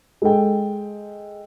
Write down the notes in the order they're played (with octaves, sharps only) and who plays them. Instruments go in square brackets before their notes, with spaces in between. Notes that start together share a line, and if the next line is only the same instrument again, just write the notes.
[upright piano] G#3 A4 G5